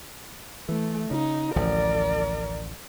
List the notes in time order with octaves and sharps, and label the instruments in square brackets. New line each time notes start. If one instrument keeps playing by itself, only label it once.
[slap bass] E3 [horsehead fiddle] A3
[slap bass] C#3 [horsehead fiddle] D#4
[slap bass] A1 D2 F3 [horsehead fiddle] A#4 D5